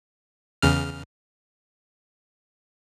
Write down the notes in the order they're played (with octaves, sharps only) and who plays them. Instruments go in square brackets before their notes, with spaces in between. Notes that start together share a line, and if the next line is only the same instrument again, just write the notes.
[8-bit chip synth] E2 C#3 F6